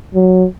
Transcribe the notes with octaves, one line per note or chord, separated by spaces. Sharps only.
F#3